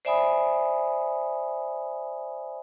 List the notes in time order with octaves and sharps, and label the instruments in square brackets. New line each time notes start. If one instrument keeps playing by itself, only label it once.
[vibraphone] C5 D5 E5 G#5 B5 D#6